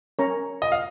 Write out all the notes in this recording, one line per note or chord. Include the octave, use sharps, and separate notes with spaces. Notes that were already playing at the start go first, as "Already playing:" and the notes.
C#4 A#4 C#5 A#5 C#6
D#5
F5